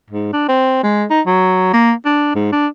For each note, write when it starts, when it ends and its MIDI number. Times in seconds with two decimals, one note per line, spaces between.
0.10 0.30 44
0.33 0.48 62
0.49 0.79 60
0.83 1.05 56
1.10 1.21 63
1.26 1.71 54
1.73 1.93 58
2.06 2.34 62
2.35 2.49 44
2.52 2.67 62